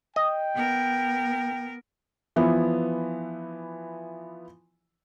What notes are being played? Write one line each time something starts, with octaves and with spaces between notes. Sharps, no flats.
D#5 G5
B3 A#4
E3 F3 B3 E4